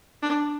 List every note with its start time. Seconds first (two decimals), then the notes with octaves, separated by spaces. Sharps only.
0.22 D4